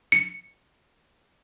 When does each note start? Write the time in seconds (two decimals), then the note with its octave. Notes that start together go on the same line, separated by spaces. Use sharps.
0.12 C#7